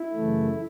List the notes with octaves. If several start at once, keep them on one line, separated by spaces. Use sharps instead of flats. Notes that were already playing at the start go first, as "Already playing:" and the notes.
Already playing: E4
F#2 C#3 E3 A3